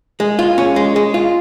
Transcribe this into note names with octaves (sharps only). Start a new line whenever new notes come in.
G#3
F4
C#4
G#3
G#3
F4